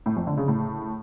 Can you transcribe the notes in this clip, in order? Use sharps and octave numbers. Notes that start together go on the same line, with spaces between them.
A2
F2
D3
C#3
A2